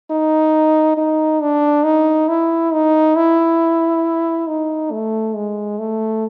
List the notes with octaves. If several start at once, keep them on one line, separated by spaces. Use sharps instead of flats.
D#4
D#4
D4
D#4
E4
D#4
E4
D#4
A3
G#3
A3